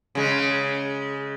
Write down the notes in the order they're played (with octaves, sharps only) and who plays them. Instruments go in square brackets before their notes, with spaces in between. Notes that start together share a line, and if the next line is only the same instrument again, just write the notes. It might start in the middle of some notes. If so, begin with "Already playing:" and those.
[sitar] C#3 G#3